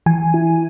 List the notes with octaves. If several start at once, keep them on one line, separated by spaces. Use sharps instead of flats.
E3 G#5
E4